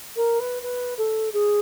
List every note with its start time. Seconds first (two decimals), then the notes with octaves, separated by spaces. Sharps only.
0.16 A#4
0.40 B4
0.63 B4
0.98 A4
1.33 G#4